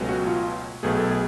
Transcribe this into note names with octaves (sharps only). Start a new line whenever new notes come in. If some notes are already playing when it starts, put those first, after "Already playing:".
Already playing: C#2 B2 F#3 A3 C#4
F#4
F4
B1 B2 A3 G#4
A4
G#4